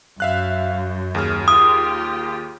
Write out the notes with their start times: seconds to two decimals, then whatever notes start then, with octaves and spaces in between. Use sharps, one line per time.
0.20 F#2 E5 F5 F#6
1.15 D#2 G#4 F6
1.48 F4 G4 D#6